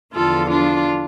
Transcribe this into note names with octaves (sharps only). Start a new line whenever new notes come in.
E2 D3 F3 F4 A4
D4 F4